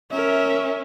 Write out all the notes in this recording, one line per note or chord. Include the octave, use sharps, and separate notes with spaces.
C#4 A#4 E5